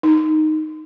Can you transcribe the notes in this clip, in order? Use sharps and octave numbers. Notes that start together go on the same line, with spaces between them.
D#4